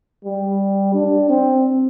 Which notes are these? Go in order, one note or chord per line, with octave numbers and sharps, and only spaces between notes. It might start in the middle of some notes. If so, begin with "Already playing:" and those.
G3
D4
C4